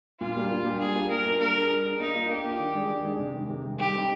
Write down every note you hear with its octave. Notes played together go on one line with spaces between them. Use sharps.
A#2 F4
G3 A#3 D4 G4
A#2
G3 A#3 D4 G4
G3 G#4
A#3 D4 F4
G3 A#4
A#3 D4 F4
G3 A#4
D4 G#4
G3
D4 G#4
A#3 D#4
D4 F4 A#4
A#3 G4
D4 F4 A#4
D#3
G#3 D4 G#4 D5
D#3
G#3 D4 G#4 D5
C3
D#3 G#3
C3
D#3 G#3
G3 G4
C4 D#4